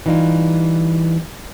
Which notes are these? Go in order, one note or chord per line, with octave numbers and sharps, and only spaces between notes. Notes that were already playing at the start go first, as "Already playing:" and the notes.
E3 G3 D#4 F4